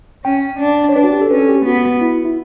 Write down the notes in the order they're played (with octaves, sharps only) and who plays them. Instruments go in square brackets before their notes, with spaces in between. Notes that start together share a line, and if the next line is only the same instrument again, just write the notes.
[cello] C#4 [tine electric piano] G5
[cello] D4
[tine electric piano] C#5
[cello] D4 [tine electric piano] B4
[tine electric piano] F#4
G4
A4
[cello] C#4 [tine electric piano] B4
[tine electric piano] A4
G4
[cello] B3 [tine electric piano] F#4
[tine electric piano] E4
E4